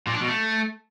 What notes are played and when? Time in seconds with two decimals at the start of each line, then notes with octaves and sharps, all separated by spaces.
0.07 A#2
0.14 D4
0.21 B2
0.28 A3